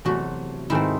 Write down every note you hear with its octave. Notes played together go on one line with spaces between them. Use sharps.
E2 C3 F#3 A3 F#4
G#2 D#3 A3 C4 E4